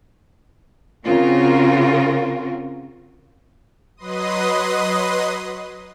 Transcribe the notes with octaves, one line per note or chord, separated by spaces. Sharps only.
C#3 C4 F4 F#4 A#4
F#3 B4 D#5 C6 D#6